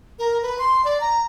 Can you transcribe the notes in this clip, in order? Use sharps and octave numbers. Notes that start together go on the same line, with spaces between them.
A#4
B4
C6
D5
A#5